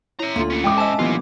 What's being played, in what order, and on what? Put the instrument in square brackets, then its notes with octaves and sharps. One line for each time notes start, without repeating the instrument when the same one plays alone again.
[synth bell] E4 C#5 [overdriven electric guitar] E5 A#5
[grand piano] D2 [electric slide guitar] A#3 F4 [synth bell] C6
[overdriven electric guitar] C#4 A4
[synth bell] G#3 D#5 E5 [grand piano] G5 D6
[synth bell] C5 E6 [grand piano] D#5 G#5 [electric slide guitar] E5 A5
[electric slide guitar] F#2 D3 E3 [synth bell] F3 B3 G4 [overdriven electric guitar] A#3 F4